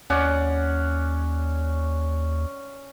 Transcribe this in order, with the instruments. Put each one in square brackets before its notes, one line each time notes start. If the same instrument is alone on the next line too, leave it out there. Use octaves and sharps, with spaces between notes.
[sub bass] D#2 [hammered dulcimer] C#4 D5 F#5